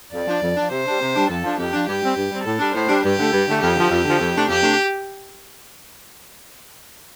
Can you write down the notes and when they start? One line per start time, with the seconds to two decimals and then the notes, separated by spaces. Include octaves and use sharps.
0.13 F2 D5
0.27 F3 D4
0.42 F2
0.56 F3 D4
0.71 C3 C5
0.86 G3 D4
1.01 C3
1.15 G3 D4
1.29 F2 A4
1.44 F3 D4
1.59 F2 G4
1.73 F3 D4
1.87 G2 G4
2.02 G3 C4
2.17 G2
2.31 G3 C4
2.45 A2 A4
2.59 G3 D4
2.74 A2 C5
2.89 G3 D4
3.03 G2 G4
3.18 D3 A3
3.32 G2
3.47 D3 A3
3.62 F2 G4
3.76 D3 F3
3.90 F2
4.05 D3 F3
4.19 F2
4.34 C3 A3 D4
4.48 F2 G4
4.63 C3 A3 D4